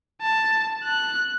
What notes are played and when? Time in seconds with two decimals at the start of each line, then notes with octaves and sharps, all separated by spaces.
0.22 A5
0.84 F#6